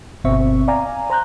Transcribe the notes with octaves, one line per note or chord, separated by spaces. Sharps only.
G1 B2 C4 E5 C#6
D5 F5 G#5 A#5
C5 A#5 F#6 G6